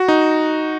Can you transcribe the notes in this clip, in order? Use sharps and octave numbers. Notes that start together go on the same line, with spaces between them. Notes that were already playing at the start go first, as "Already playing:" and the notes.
Already playing: F#4
D#4